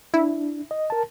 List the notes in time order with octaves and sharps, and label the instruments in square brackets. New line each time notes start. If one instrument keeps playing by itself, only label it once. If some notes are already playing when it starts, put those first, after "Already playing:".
[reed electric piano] D4 [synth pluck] E4
[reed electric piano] D#5
A#4 A5